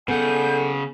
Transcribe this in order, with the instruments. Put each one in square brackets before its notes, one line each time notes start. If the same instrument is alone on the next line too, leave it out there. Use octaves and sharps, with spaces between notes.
[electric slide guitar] C#3 F#5 [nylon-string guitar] B3 [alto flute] A4 [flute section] G#5 G6